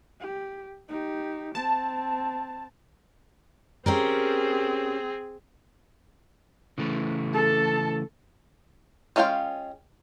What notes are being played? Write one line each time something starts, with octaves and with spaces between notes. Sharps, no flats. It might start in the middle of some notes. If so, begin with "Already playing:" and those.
G4
D#4 G4
C4 A5
C4 C#4 G4 G#4 A#4
C#3 E3 A3
A4 A5
G#3 C#4 F4 F5 G5